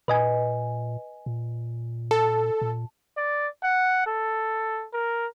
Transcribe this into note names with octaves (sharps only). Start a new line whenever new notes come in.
A#2 B4 D#5 G#5
A#2
A4 A5
A#2
D5
F#5
A4
A#4